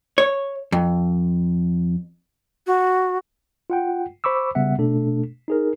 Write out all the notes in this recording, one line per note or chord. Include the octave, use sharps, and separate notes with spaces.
C#5
F2
F#4
F4 F#5 G5
C5 B5 C#6 D6 E6
C#3 G3 B3 E5 F#5
B2 A3 D4 A4
D#4 G#4 A#4